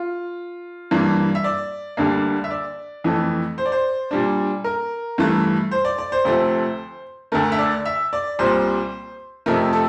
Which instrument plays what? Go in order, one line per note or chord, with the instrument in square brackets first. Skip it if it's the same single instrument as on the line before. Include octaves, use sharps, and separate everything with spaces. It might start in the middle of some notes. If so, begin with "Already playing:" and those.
Already playing: [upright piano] F4
G2 E3 A#3 D4
E5
D5
D2 D3 G3 A#3 D4
E5
D5
F2 E3 A3
C5
D5
C5
A#2 G3 D4
A#4
G2 E3 A3
C5
D5
D5
C5
D2 C3 F3 A3 C5
D2 D3 A3 A#4
E5
D5
E5
D5
C2 A#2 G3 C5
F2 C3 F3 A3 A#4
A4